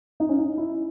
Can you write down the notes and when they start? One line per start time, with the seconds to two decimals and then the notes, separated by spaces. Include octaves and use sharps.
0.20 D#4
0.29 C#4
0.38 D#4
0.57 E4